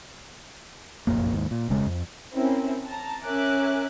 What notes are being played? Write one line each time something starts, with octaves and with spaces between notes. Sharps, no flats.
F1 A#1 F#2 A#3
D#2 G#2
A#2
E1 C#3 G#3
F2
C4 C#4 E4 A#4
A5 A#5
C#4 A#4 E5 G#5 D6 F#6